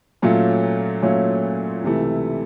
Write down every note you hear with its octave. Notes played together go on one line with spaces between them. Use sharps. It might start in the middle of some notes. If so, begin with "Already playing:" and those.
A#2 F#3 A3 C#4 F4
A#2 F#3 A3 C#4 F4
C#2 C3 E3 A3